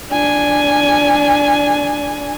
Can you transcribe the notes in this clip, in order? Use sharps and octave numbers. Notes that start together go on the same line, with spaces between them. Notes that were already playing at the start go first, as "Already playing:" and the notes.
D4 G#5